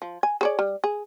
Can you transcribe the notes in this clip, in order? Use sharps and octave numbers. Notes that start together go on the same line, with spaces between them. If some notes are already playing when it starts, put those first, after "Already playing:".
F3
G#5
G#4 C#5 D5
G3
G#4